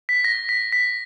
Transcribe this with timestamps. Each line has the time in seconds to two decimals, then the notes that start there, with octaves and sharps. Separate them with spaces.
0.09 B6
0.24 A#6
0.49 B6
0.73 B6